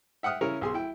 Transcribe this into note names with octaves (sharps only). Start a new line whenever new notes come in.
E5 F#5 G5 D#6 F6
C#3 C#4 E4 A#4 C#5
B1 G#4 C6
E4 G5